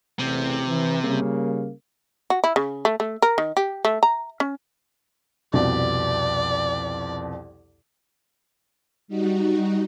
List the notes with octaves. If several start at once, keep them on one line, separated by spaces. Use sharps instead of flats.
A1 E2 C3
E3
C#3 G3 A#3
F#4
E4
C#3
A3
A3
A#4
D#3
G4
A3
A#5
C#4
C2 F2 B2 D5
G3 D#4 F#4